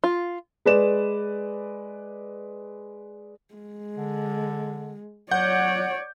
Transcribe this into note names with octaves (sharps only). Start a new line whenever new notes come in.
F4
G#3 B4 D5 E7
G#3
D3
F#3 C#5 D5 F#5 G6